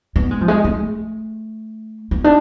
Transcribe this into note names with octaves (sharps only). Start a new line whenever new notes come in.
B3
G#3
F3
G#3
A3
B3
D4